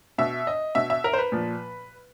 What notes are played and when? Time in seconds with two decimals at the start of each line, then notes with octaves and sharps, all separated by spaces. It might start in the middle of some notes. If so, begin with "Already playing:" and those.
0.18 B2 E5
0.47 D#5
0.75 B2 E5
0.90 E5
1.04 A#4
1.13 C5
1.18 B4
1.32 A#2 F3